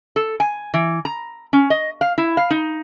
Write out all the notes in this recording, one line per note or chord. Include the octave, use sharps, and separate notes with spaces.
A4
G#5
E3
A#5
C#4
D#5
F5
E4
F5
D#4